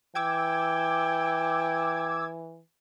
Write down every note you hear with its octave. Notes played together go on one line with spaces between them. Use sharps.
E3 G5 D6 E6 G#6